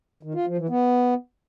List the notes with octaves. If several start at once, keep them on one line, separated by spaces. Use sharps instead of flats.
D#3
F4
F3
E3
B3